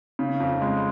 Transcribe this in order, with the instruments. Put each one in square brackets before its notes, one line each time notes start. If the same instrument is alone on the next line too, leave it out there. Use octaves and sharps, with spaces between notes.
[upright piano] C#3
F2
G#3